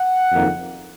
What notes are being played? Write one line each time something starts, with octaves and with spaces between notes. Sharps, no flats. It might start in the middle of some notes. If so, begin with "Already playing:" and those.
Already playing: F#5
F#1 F2 D#3 A#3 D#4